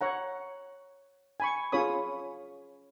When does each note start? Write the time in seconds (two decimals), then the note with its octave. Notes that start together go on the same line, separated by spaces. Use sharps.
0.01 C#5 F#5 A#5
1.40 G#5 B5 C#6
1.72 C#4 F4 G#4 C#5 B5 D#6